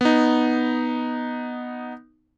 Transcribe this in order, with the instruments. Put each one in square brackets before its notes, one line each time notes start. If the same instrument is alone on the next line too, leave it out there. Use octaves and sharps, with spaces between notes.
[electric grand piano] B3 D#4